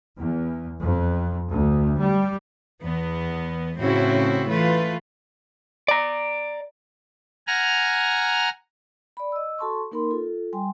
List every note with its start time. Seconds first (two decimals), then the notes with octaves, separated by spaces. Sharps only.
0.16 E2
0.82 F2
1.47 D2
1.98 G3
2.83 E2 B3
3.79 A2 C#3 C4 C#4 E4 F#4
4.49 E3 A3 F4 B4
5.88 D5 A#5
7.47 F#5 G#5 A#5 F6
9.17 D5 B5
9.32 D#5 E6
9.58 F#4 A4 A5 C6 C#6
9.92 A#3 D#4 A#4 B5 C6
10.11 F4 A4
10.53 G3 G5 G#5 C6